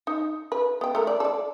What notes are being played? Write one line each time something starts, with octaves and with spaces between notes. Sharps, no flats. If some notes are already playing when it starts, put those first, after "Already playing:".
D#4
B4
B3 G5
A3 A#4
D5
A4 D5